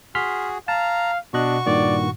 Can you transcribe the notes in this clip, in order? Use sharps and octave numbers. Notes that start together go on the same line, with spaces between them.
F#4 G#4 C6 F6 B6
F5 A5 A#5
B2 D4 F#4 D#5 C#6 F#6
G2 A#2 D#3 D5